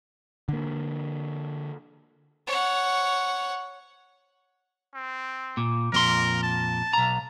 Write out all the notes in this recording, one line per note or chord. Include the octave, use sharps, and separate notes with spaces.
D3 A#3
C#5 F#5
C4
A#2
F2 A#2 A#4 C6
A5
B1 A#5